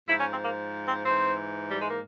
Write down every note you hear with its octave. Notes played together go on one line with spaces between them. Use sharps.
G#2 F3 E4
C#4
C4
A#3
C4
G#2 E3 C4
G3
G#3
A#3